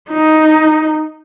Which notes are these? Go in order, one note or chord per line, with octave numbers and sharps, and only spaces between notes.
D#4